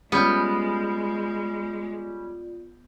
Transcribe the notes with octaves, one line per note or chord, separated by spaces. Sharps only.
G3 G#3 B3 C#4 F4 D5 G6